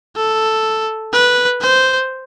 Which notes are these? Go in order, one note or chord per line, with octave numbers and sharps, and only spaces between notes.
A4
B4
C5